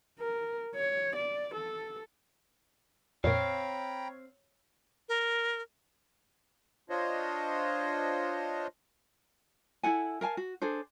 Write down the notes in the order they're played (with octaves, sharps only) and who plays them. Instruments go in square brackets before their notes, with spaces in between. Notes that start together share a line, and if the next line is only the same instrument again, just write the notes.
[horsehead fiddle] A#4
C#5
D5
A4
[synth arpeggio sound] F2 A#2 [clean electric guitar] C4 F5 [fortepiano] C#5 [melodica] G5 A#5 B5
[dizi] A#4
[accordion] D4 F4 C5 C#5 D#5
[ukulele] E4 A4 F#5 G#5
A#4 F5 G#5 A5
F#4
D4 G#4 A4 C5